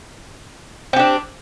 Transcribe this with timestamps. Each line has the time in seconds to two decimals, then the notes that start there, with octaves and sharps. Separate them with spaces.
0.93 C4
0.96 G4
0.99 D4